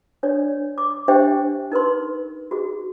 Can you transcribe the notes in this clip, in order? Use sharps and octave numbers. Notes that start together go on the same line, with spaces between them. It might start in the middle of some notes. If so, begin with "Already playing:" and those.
D4 C#5 D5
D6
D4 G4 C5 E5 G5
D#4 A#4 B4 C6
F#4 G#4